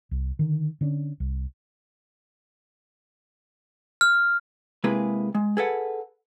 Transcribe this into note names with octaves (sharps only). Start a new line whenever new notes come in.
C2
D3 D#3
D3 C#4 D4
C2
F6
C3 G#3 A#3 E4 G#4 B4
G#3
G#4 A4 B4 F#5